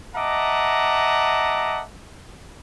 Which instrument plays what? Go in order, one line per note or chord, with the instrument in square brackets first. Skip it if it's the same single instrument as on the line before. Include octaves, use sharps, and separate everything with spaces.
[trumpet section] D#5 E5 F#5 A5 A#5 D6